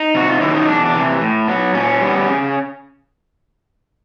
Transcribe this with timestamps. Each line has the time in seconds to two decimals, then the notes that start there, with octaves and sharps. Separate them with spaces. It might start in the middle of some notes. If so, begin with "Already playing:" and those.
Already playing: D#4
0.14 C3 F#4
0.29 F4
0.41 D#3 F#3 A#3 C#4 E4
0.55 D#4
0.68 E2 D4
0.85 D4
0.95 C3 E3
1.21 A2
1.48 F#3 B3
1.75 A#2 C#4
2.02 G3 B3
2.28 C#3